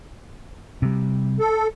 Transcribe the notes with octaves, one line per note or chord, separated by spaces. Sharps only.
C3 G3
A4